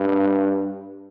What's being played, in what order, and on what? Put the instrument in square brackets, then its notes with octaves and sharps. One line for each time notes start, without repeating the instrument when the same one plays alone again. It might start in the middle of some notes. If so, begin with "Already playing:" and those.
Already playing: [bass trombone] G2